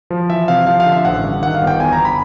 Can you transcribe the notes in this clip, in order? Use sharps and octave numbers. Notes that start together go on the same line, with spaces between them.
F3
E3 E5
C3 F5
F3 F5
F5
D3
E5
A1 F#5
G2
D#3 F#5
F5
G1
G5
E2 G#5
A#5
B5